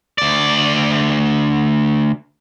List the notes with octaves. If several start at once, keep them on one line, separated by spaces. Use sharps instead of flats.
D2 D5